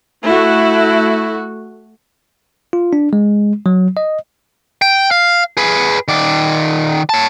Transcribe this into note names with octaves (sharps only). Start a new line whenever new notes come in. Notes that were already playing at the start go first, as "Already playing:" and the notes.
A3 E4 F#4
F4
D4
G#3
F#3
D#5
G5
F5
G#4 B4
D#3 D5
C#5 A5